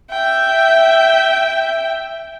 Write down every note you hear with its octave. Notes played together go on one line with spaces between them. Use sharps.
E5 G5